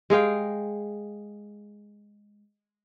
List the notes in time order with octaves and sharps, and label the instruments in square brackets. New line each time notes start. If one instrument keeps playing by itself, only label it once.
[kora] G#3 G#4 F5 G5